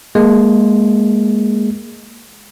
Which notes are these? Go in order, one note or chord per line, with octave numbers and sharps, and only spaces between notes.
G#3 A#3